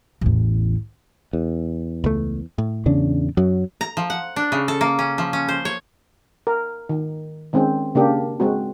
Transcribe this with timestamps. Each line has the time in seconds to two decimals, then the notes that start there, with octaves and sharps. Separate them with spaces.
0.21 A1 E2
1.33 E2
2.04 C#2 A3
2.58 A2
2.86 E2 C#3 D4
3.37 F#2 F#3
3.81 A#5
3.97 F3
4.10 F#5
4.36 D4
4.52 C#3
4.68 A4
4.81 A#3
4.99 C#4
5.18 F3
5.33 C#4
5.48 C5
5.65 C#5
6.47 A#4
6.89 D#3
7.53 D#3 G#3 C4 C#4
7.95 C#3 A#3 D4 G4
8.40 G#3 C4 F#4